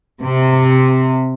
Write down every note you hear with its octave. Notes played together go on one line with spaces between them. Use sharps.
C3